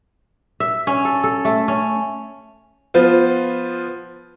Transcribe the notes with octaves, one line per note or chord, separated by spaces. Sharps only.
E5
C#4
A4
A4
A3
C#4
F3 B3 F4 C5